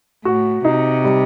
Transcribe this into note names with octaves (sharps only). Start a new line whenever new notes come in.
A2 F#4
C3 D#4
G3